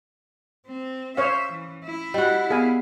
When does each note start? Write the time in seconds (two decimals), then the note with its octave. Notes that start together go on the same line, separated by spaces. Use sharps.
0.67 C4
1.17 C#4 C5 C#5 E5 F5
1.52 E3
1.84 E4
2.14 G3 F#4 D#5
2.50 B3 G#4 F5 G#5